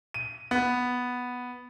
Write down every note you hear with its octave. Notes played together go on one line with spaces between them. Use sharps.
D#7
B3